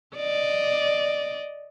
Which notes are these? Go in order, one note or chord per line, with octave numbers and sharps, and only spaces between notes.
D5 D#5